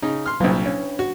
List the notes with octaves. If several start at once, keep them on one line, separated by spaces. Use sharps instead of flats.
C#3 D#4
C6 F6
C2 A#2 F#3 D4
C#4
F#4